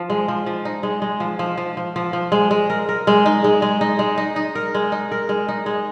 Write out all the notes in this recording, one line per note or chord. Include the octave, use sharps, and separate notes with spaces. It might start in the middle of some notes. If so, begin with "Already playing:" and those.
Already playing: F3
G#3
F3
F3
D#4
G#3
G#3
F3
F3
F3
F3
F3
F3
G#3
G#3
A#4
A#4
G#3
D#4
G#3
G#3
D#4
G#3
D#4
D#4
A#4
G#3
D#4
A#4
G#3
D#4
G#3